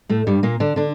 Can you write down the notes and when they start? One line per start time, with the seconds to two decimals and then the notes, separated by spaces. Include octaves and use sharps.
0.09 A2 A3
0.27 G2 G3
0.43 A#2 A#3
0.60 D3 D4
0.76 D3 D4